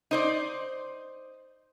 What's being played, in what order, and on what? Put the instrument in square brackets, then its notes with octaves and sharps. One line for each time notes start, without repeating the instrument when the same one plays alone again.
[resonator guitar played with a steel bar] D#4 C5 D5